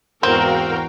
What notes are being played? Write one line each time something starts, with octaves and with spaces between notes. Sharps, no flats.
E2 G#2 E3 C4 F#4 A#4 F5 G5